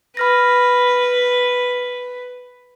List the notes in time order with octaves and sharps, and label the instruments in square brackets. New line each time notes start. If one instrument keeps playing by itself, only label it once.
[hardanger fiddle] B4 [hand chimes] B5 F6 A#6